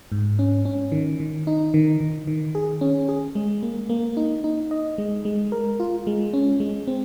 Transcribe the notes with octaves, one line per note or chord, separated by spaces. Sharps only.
G#2
C#4
C#4
D#3
D#3
D#4
D#3
D#3
D#3
G#4
C#4
G#4
G#3
A#3
A#3
D#4
D#4
D#5
G#3
G#3
A#4
F4
G#3
C#4
G#3
C4